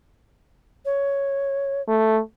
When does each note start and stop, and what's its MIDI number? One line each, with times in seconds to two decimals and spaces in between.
0.85 1.81 73
1.88 2.20 57